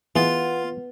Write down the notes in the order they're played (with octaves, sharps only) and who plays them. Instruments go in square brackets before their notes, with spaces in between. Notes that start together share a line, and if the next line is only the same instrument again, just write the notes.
[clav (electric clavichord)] E3 G#4 [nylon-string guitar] B3 [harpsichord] F4